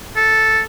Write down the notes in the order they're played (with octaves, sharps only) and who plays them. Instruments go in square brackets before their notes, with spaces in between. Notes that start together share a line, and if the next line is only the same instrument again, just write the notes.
[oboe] A4